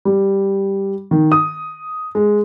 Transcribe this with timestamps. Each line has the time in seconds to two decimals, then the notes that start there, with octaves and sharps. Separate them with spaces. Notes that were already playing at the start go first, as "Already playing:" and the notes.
0.05 G3
1.11 D#3
1.32 D#6
2.15 G#3